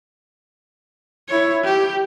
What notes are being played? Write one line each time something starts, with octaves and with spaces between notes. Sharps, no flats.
E4 C#5
G4